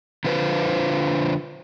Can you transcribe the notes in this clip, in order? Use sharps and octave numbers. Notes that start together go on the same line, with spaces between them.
D3 F3 F4 B4 C5